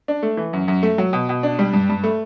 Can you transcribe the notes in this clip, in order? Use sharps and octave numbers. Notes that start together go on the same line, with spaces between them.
D4
A3
E3
F#2
F#2
A3
F#3
B2
B2
D4
G3
G2
G2
A3